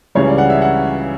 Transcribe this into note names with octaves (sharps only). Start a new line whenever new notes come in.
C#2 C#3 E3 G3 C#5
D5
F#5
E5
F#5